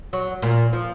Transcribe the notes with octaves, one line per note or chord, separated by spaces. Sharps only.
F#3
A#2
F3